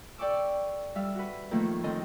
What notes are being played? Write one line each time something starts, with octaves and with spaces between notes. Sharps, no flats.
A4 D5 G5 C#6 D6 E6
G3 E5 F5
F#4 B4
A2 D#3 F3 A3 A#3
A2 D#3 C4 A4 D#5 C6